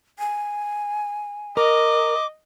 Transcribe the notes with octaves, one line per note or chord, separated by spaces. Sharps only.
G#5
A#4 D#5 D6